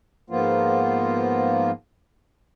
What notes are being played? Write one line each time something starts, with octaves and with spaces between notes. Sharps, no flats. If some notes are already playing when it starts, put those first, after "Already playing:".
G#2 F3 A#3 B3 F4